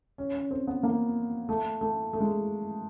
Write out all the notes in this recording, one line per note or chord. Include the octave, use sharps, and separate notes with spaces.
C#4
C#4
C4
B3
A#3
A3
A3
A3
G#3